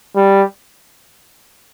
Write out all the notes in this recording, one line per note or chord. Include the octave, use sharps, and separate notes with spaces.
G3